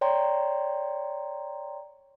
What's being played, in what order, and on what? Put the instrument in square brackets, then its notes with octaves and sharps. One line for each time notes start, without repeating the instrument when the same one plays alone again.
[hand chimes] C#5 D5 G5 A#5 C6